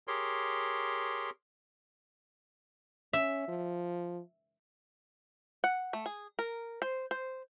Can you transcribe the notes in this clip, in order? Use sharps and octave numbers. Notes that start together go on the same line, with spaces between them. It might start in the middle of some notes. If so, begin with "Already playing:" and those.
G4 G#4 A#4 C#5 C6
C#4 E5
F3
F#5
A3
G#4
A#4
C5
C5